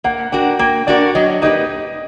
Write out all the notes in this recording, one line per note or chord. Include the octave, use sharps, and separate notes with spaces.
A#3 F#5
D4 F#4 A#4 G5
A#3 G5
D4 F#4 A#4 D5
F#3 D#5
A#3 D#4 G4 B4 D#5